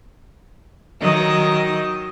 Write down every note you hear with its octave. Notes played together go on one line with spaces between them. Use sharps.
D#3 F#3 D#5